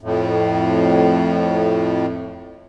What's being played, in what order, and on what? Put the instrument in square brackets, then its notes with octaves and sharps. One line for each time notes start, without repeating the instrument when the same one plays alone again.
[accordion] F2 A2